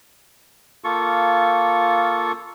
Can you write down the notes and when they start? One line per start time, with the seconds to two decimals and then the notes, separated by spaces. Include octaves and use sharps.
0.84 A#3 F4 A4 C#6